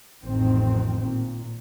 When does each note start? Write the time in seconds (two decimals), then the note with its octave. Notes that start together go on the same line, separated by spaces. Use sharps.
0.25 A1 F2 D#3 C4
1.03 A#2